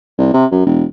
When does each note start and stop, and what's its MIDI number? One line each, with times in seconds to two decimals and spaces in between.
0.18 0.31 36
0.34 0.46 48
0.52 0.65 42
0.66 0.84 28